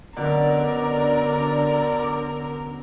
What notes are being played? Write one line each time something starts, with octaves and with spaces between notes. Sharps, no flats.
F#2 B2 D3 A#4 D5